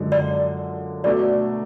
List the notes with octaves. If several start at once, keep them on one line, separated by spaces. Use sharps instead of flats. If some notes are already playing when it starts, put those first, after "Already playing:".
Already playing: F#2 D3 F3 G#3
D5
B2 F#3 A3 D4 D5